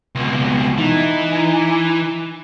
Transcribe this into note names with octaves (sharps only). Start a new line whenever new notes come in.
C#2 B2
E3 D#4